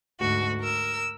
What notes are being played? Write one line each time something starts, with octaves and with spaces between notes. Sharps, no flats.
D2 G#2 F#4
A#4 E6